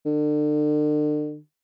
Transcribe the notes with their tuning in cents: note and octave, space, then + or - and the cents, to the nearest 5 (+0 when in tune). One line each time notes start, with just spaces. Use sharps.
D3 +35